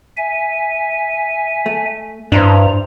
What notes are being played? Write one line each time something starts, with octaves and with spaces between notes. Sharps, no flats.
E5 G#5
A3
G2 D4 E4 C5 A#5